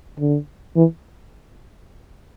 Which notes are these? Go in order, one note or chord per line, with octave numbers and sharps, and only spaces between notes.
D3
E3